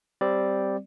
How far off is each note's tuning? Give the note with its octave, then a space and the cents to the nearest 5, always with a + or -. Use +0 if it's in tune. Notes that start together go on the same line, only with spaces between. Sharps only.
G3 +0 C4 +0 D5 +0